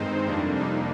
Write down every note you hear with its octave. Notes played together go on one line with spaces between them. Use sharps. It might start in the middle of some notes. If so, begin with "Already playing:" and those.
Already playing: G2 D#3 G#3 C4 D#4 C5
F2 C3 G3 A#3 D4
D#4